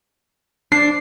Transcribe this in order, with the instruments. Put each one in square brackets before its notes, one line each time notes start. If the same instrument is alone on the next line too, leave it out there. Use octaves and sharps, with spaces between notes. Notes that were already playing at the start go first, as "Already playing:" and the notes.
[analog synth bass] D4 [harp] C7